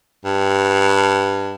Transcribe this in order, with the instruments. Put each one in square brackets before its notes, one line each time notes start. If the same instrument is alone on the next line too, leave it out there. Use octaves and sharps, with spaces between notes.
[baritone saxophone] G2